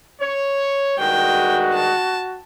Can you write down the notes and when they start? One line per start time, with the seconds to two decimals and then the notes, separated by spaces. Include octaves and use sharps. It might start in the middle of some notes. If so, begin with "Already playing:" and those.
0.21 C#5
0.99 G2 D#3 G#3 F#4 G5
1.74 A5